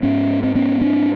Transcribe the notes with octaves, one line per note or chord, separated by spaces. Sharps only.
G#2 B3 C#4
C4
B3 C#4
C4 D4